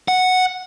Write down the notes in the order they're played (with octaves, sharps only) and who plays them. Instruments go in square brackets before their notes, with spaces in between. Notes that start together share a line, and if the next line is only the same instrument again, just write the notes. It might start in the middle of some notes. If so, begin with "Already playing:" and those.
[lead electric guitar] F#5